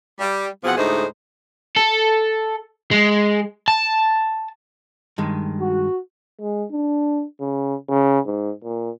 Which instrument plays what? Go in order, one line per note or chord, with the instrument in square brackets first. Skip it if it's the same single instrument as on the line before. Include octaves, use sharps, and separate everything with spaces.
[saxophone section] G3
E2 B2 F3 C4 G#4 F#5
D2 A2 G#3 A3 D#4 C5
[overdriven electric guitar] A4
G#3
A5
[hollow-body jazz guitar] G2 D#3 G#3
[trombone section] F#4
[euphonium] G#3
D4
C#3
C#3
G#2
A#2